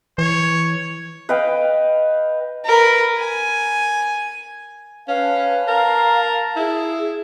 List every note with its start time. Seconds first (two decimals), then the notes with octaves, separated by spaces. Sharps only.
0.18 E3 C#5
1.29 B4 D#5 F5 G5
2.66 A#4 B4
3.19 G#5
5.08 C#4 B4 F5 A5
5.68 A#4 F5 A5 A#5
6.56 E4 G#4